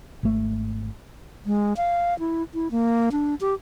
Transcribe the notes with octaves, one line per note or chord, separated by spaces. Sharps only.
G#1 A3
G#3
F5
E4
E4
A#3
D4
G4